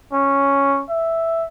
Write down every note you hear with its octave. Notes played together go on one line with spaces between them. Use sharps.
C#4
E5